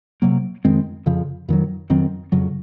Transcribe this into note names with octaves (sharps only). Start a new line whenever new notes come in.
C3 F#3 A#3
F2 D#3 G#3 C4
F2 C#3 F3
F2 D#3 F#3
F2 D#3 F#3 C4
F2 C#3 F#3